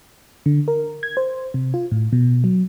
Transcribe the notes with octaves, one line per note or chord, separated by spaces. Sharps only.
D3
A#4
G#6
C5
C3
F4
A2
B2
F#3